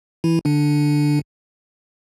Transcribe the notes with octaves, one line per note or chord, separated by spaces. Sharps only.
E3 E4
D3 D4